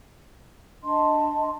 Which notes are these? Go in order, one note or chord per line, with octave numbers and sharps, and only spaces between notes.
D4 D#5 A5 C6